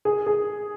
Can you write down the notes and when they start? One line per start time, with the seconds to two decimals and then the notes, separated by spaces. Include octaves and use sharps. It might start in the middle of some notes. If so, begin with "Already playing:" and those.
0.05 G#4
0.27 G#4